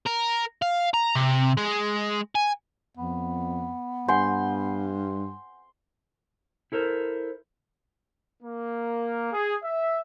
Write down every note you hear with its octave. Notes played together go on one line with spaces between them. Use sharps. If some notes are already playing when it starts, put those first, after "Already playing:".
A#4
F5
A#5
C3
G#3
G#5
F2 B3
G2 F#5 G#5 C6 G6
E4 A4 A#4 C5
A#3
G#4
E5